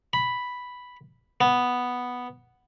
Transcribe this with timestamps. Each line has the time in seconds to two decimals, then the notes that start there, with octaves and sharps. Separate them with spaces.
0.13 B5
1.41 B3